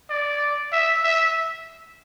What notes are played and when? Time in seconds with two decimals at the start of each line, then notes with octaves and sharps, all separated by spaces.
0.10 D5
0.72 E5
1.04 E5